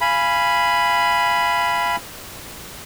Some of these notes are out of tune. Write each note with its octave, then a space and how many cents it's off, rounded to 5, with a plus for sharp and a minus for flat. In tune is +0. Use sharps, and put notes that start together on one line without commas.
F5 -20 G#5 +0 B5 +0